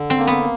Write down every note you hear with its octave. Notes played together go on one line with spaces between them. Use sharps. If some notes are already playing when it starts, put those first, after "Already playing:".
Already playing: D3
C4
A#3
B3